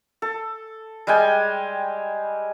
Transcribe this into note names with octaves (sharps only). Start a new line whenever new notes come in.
A4
G3 G#3 G5 G#5